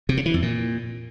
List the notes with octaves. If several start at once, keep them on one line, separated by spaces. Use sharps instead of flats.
C3
C#3
E3
F2
A#2